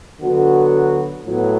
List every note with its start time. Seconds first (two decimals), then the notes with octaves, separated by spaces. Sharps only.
0.20 D3 F#3 B3 F#4
1.24 A2 F#3 B3